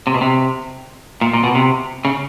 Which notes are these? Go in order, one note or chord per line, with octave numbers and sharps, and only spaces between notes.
C3
B2
C3
A#2
A#2
B2
C3
C#3